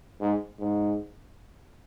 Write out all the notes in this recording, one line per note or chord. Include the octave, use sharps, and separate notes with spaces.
G#2
G#2